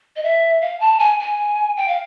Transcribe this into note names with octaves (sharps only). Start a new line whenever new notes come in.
D#5
E5
F5
A5
G#5
G#5
G5
F5